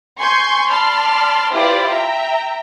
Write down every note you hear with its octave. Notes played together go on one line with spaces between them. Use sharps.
G#5 C6 C#6 G6
D5 A5 B5 C6 F6
E4 F4 G4 B4 C5 D5
E5 G5 A#5